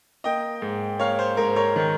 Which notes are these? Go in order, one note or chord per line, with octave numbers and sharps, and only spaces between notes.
A#3 D#5 G5
G#2
A#3 C#5 F5
C5
G#2 A#4
A#4 C#5
D#3